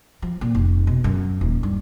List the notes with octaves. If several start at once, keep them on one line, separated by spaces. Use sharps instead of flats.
F3
A#2
F1
B2
F#2
D#1
G2